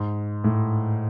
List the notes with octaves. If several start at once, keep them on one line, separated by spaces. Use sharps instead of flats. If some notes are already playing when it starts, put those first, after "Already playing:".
Already playing: G#2
A2